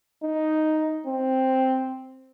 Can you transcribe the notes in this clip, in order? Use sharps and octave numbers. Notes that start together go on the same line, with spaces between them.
D#4
C4